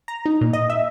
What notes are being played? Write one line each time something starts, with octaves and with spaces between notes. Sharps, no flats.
A#5
D#4
A#2
D#5
E5